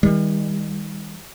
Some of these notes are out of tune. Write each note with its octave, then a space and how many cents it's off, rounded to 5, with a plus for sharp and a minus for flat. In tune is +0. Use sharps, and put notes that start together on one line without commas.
D#3 +40 G3 +40